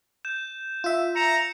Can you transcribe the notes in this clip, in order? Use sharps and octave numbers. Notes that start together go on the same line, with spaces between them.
G6 E7
F4 E5
A#5 C#7 E7